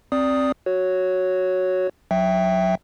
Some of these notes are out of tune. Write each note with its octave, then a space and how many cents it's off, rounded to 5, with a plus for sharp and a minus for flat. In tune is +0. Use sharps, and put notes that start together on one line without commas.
C4 +15 D5 -5 D#6 +0
F#4 +0 C#5 +0
F#3 -10 E5 +0 G5 +0